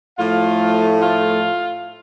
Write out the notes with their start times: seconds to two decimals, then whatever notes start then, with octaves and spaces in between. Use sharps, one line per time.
0.19 A2 F3 A3 F4 F5
0.99 F4 F5